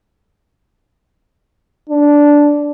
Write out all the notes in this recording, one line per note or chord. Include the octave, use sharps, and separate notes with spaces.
D4